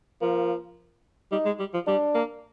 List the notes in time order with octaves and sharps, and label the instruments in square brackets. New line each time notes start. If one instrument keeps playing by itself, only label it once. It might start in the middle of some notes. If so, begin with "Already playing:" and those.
[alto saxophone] F3 [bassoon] A#3
[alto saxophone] G3 [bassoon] D#4
[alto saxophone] G#3
G3
F3
[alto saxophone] G3 [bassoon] D4
[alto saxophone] A#3